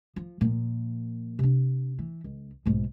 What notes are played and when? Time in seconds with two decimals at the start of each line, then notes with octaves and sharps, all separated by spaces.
0.16 F3
0.41 A#2 F3
1.39 C3 D4
1.98 E3
2.24 C#2
2.66 B1 G#2